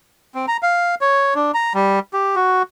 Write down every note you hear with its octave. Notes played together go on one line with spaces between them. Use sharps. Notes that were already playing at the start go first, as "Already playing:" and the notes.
C4
A#5
F5
C#5
D4
A#5
G3
G4
F#4